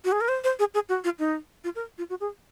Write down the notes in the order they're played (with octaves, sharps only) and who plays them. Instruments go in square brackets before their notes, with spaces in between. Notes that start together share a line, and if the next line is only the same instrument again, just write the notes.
[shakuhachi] F#4
G#4
A#4
C5
C5
G#4
G#4
F#4
F4
D#4
F4
A#4
F4
F#4
G#4